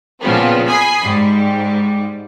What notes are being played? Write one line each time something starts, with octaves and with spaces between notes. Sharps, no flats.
A#2 C#3 F3 B3 C4
G#5 B5 D#6 C7
G#2 G3